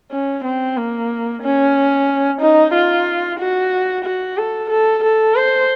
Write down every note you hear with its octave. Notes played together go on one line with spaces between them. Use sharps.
C#4
C4
A#3
C#4
D#4
F4
F#4
F#4
A4
A4
A4
C5